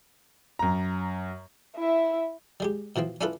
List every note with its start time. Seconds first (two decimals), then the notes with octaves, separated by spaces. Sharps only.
0.59 F#2 A#5
1.76 E4 E5
2.60 G3 G#3 G4
2.96 B2 E3 F3 C4
3.21 C#4 D4 E4 F4 A4 B4